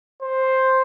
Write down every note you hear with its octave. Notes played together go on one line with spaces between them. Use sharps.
C5